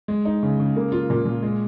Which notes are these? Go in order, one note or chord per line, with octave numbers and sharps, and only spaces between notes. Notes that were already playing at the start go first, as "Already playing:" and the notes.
G#3
D#4
C#3
C#3
A#3
F4
A#2
A#2
G#3